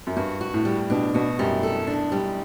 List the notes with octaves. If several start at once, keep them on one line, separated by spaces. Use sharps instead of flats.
F#2
G2 F#4
F#4
A2
G3
B2 D4
B2 F#4
F#2 G3
A4
D4
G3